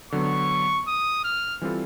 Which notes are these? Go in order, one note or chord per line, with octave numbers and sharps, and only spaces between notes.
D3 F#3 B3 C#6
D#6
F6
E3 G3 C4 F4 A4